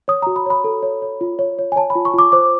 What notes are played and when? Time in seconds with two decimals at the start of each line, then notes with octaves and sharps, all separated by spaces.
0.08 C#5 D#6
0.22 F#4 A#5
0.36 B5
0.46 C#5 B5
0.64 A4
0.83 C#5
1.02 C#5
1.21 F4
1.39 C#5
1.59 C#5
1.72 G#5
1.76 C#5 A5
1.90 B5
1.95 F4
2.05 C#6
2.14 F4 D6
2.32 C5 D6